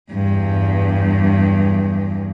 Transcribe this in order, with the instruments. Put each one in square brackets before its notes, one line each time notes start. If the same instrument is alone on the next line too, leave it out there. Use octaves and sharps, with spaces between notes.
[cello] E2 G2